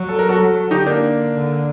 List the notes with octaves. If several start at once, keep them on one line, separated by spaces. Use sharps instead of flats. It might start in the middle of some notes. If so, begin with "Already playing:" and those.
Already playing: F#3
A4
A#4
F#4 A4
F#3
D3 D#4 G4
A#3 D4
D3